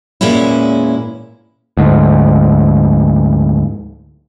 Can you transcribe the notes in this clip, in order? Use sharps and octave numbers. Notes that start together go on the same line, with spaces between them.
E2 A#2 G#3 C#4 E4
D2 G#2